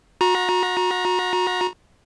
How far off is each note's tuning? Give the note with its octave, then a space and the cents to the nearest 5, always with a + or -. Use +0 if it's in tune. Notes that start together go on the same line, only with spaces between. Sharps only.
F#4 -30 A#5 +20